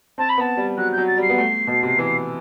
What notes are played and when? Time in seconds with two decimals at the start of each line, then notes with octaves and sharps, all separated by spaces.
0.18 C4 A5
0.29 B5
0.38 B3
0.40 A5
0.57 G3
0.77 F#3 F#6
0.92 G6
0.98 F#3
1.07 A6
1.17 G3
1.22 C7
1.30 B3
1.38 A3
1.67 B2
1.83 C3
1.99 E3